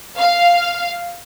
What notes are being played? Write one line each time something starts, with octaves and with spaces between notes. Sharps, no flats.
F5